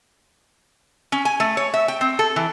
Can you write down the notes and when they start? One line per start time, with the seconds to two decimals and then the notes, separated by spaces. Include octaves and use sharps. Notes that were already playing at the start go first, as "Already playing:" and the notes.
1.12 C#4
1.25 G#5
1.40 A3
1.57 C#5
1.74 E5
1.88 G5
2.01 C4
2.19 A4
2.36 E3